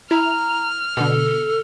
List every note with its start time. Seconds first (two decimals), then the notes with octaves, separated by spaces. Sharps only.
0.11 E4 A#5 F6
0.97 B2 D3 A4